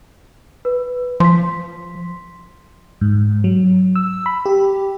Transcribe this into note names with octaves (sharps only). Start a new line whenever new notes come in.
B4
F3 C6 B6
G#2
F#3
E6
B5
G4